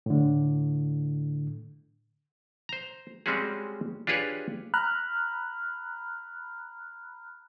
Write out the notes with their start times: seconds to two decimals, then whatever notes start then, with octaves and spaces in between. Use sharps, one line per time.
0.06 A2 D3
2.69 C5 A#5
3.26 G3 G#3 C4 C#4 F#4 G#4
4.07 D4 F4 G4 G#4 B4 C#5
4.74 A#5 B5 F6 F#6